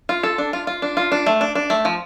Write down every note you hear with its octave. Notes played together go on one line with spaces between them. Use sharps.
F4
A4
D4
F4
F4
D4
F4
D4
A3
D4
D4
A3
F3